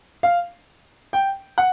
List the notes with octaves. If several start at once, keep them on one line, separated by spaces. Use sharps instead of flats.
F5
G5
F#5